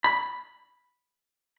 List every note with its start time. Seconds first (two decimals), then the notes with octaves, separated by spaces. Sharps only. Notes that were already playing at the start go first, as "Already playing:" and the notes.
0.04 B5